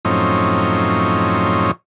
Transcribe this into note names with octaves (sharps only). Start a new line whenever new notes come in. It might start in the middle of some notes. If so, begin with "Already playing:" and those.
F#2 A2 F3 C4 C#4 D#4